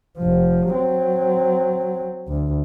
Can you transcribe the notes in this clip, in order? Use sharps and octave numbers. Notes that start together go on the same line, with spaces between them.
F1 F3
F#3 C4
D2